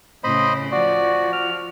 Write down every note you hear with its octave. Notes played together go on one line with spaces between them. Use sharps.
A2 C#3 C5 D#5 B5
F3 F#4 D5
F6